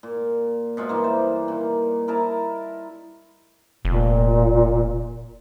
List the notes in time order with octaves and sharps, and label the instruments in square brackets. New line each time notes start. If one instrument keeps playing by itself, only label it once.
[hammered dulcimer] A#2
B2 G#3 F4
G2 E3 A#3
C5
A#2 D#3
E4 A#4 D#5 A5
[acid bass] F1 [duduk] A#2